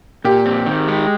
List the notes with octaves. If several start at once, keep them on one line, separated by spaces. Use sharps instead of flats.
A#2 G4
C4
D#3
G#3